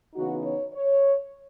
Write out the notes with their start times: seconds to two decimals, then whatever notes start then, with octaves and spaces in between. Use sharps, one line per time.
0.14 C#3 E3 B3 D#4 F#4
0.44 C#5
0.73 C#5